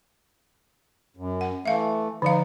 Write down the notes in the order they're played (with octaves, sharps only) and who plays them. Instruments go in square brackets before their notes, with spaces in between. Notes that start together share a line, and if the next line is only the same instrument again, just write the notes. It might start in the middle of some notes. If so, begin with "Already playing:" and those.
[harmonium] F#2
[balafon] F#5
[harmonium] E3 A3 [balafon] E5 F5
[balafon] D3 F3 F5 [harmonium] D#4